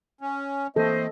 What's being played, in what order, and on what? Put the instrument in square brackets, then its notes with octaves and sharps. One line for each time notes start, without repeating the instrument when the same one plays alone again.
[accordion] C#4
[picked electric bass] E3 A#3 [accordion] A3 C4 [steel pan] A4 [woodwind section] C5 D#5